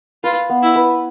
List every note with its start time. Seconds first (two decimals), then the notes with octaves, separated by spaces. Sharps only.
0.24 F4 B4
0.50 B3
0.63 E4
0.76 B4